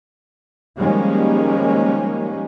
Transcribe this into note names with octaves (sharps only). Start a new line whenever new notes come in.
D#3 F3 G3 G#3 A#3 C#4